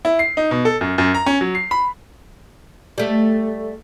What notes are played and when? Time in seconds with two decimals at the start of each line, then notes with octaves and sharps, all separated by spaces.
0.05 E4
0.19 C7
0.37 D#4
0.51 B2
0.65 A4
0.81 F#2
0.98 F#2
1.14 A#5
1.26 C#4
1.41 F#3
1.55 C7
1.71 B5
2.98 G3 A3